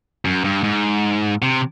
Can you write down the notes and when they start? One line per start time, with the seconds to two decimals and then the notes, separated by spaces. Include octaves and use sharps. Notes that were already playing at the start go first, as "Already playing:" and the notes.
0.25 F#2
0.44 G2
0.63 G#2
1.42 C3